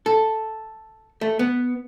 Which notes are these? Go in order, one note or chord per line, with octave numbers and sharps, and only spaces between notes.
A4
A3
B3